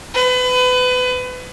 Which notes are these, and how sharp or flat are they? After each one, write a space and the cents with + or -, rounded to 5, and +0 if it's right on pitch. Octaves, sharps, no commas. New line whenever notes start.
B4 +30